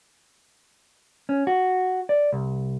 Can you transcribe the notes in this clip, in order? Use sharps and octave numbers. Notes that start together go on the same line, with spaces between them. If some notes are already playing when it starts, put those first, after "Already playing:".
C#4
F#4
D5
C2